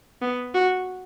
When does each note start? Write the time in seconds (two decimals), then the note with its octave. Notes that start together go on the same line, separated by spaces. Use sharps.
0.22 B3
0.55 F#4